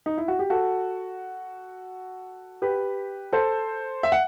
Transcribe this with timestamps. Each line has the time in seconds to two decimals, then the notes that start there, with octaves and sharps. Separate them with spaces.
0.06 D#4
0.18 E4
0.28 F#4
0.39 G4
0.50 F#4 A4
2.62 G4 B4
3.33 A4 C5
4.03 E5
4.12 F#5